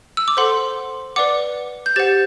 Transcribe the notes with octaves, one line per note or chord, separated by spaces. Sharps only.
E6
D6
A4 C5 F#5 C6
B4 D5 F#5 D6
G6
G4 C5 F#5 A6